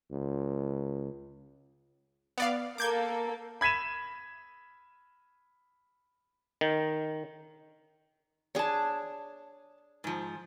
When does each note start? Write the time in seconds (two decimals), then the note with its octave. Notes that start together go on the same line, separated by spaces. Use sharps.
0.11 C#2
2.38 B3 D5 F5
2.78 A#3 A4 D6 G6 G#6
3.61 B5 G#6 B6 D#7 E7
6.61 D#3
8.55 D4 G#4 C#5 A5
10.04 G#2 F3